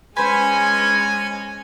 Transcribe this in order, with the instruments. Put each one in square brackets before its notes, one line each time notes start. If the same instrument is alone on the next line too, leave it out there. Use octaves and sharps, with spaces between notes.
[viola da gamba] G#3 C#4 [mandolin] B4 C5 [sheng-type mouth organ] G#5